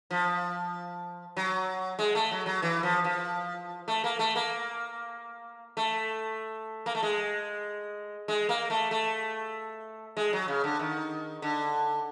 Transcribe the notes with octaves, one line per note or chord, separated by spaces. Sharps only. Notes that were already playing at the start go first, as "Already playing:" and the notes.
F3
F#3
G#3
A3
F#3
F#3
E3
F3
F3
A3
A#3
A3
A#3
A3
A#3
A3
G#3
G#3
A#3
A3
A3
G#3
F#3
C#3
D3
D#3
D3